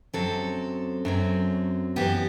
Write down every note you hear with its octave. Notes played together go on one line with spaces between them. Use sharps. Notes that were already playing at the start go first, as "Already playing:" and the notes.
F#2 F#3 C4 A4
F#2 F#3 C4
F#2 E3 B3 G4